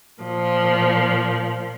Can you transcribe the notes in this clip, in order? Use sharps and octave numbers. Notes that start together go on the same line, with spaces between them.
A#2 F3